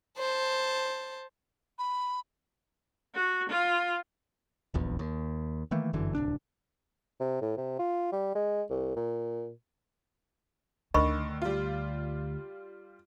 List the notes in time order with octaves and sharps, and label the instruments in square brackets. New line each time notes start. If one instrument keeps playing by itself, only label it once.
[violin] C5 A5
[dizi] B5
[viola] F#4
F4
[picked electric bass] D#1 A#1 E2
D#2
D#3 E3 A3 A#3
G1 F#2 D3 E3
D1 C2 D4
[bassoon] C3
A2
C3
F4
G3
G#3
C2
A#2
[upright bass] D2 [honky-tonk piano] D3 D#3 [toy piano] D#5 B5 C#6
[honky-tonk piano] G3 F4